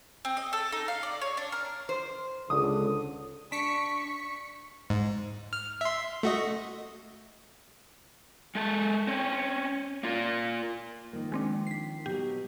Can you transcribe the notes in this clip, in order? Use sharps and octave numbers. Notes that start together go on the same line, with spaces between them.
C4
D#5
A4
D#4
F5
D5
C#5
D4
A#4
C5
C#2 D3 D#6
D4 C#6 B6 C#7
G#2
F6
E5 C6
A3 F#4 D#5
G#3 A4 A5
C4 C#4
A#3 F4 A#4
D#3 F3 A#3
G#3 C4 D4
B6 C7
B2 F#3 G4